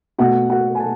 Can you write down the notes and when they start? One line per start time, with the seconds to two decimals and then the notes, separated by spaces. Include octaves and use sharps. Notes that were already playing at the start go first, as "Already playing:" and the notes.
0.18 B2 A3 F#4 F#5
0.49 F#4 F#5
0.75 G#5
0.80 A5